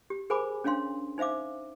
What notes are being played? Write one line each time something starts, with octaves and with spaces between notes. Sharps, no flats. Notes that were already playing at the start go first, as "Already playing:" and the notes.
G4
G#4 A#4 C5 G#5 B5 D6
C#4 D4 C#5 F5 C6
D#4 C5 E5 F5 D6